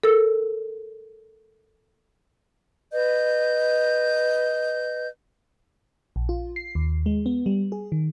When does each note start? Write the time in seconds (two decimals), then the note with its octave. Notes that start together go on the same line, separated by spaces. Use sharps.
0.03 A4 A#4 E6
2.92 B4 D#5 G6
6.16 A#1
6.29 F4
6.56 C7
6.75 D#2
7.06 G#3
7.26 B3
7.46 G3
7.72 G#4
7.92 D#3